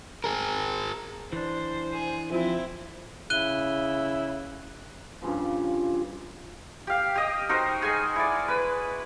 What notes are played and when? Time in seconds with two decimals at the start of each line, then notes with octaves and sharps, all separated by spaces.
0.24 G#4 A#4
1.33 E3 D4 C5
1.93 G#4
2.32 F3 C4 E4
3.30 C#3 E4 F#6 D#7 G7
5.22 G2 C#3 F3
6.87 G4 F5
7.15 G4 D#5
7.49 D#4 F#4 A#4 C5
7.82 G#3 G#4 G#5
8.16 E4 D5
8.48 B4